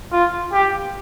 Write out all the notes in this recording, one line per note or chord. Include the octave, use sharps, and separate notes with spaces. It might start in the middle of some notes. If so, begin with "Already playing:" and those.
F4
G4